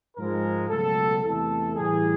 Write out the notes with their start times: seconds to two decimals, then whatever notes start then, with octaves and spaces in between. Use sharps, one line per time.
0.15 G#2 F3 G#3 A#4
0.69 C#2 B2 F#3 A3 A4
1.22 E2 C3 E3 A3 A4
1.75 A2 E3 G3 G#4